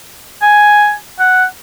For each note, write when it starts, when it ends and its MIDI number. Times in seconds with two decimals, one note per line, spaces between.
0.42 0.94 80
1.19 1.45 78